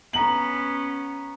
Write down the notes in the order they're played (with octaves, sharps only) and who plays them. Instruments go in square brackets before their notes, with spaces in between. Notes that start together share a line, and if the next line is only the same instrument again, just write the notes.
[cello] B3 C#4 [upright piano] A#5 F#7